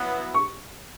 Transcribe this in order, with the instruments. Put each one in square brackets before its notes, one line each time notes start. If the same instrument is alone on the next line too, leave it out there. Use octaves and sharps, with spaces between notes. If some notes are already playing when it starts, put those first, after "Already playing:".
Already playing: [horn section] F#3 B3 E4
[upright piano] C#6